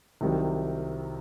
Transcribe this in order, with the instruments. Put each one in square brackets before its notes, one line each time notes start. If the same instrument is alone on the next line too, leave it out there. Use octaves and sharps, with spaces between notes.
[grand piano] C2 C3 D#3 F#3